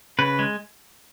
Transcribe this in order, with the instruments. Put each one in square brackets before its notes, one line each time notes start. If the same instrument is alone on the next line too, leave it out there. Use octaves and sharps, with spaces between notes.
[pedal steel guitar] C#3 B4
G#3